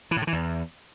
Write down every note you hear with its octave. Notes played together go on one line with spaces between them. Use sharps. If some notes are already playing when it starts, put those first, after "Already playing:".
E3
A2
D3
E3
E2